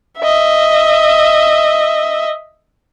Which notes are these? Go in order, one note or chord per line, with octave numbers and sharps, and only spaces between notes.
D#5 E5